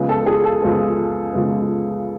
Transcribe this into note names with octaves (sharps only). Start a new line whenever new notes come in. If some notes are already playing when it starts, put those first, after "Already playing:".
Already playing: C#2 C#3 F3 G#3 B3
A4
G#4
A4
C#2 C#3 F3 G#3 B3
C#2 C#3 F3 G#3 B3